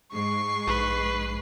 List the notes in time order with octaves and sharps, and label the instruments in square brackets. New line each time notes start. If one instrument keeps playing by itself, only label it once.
[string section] G#2 G#3 C7 [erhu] C#6
[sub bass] A#1 [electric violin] B4